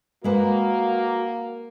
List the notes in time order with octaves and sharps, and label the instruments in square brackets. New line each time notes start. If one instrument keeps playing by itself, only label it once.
[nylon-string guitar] G#3 B4 C5 [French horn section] A#3 [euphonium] F#4